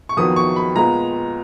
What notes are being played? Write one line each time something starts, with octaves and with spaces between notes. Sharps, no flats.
C#6
F2 D#3 F#3 B3 D#6
C#6
B5
A#2 G#3 B3 A#5